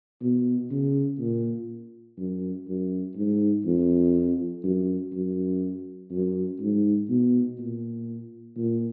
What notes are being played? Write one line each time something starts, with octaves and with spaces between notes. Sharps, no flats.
B2
C#3
A#2
F#2
F#2
G#2
F2
F#2
F#2
F#2
G#2
B2
A#2
A#2